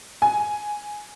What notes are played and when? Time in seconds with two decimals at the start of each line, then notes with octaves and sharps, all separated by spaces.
0.22 G#5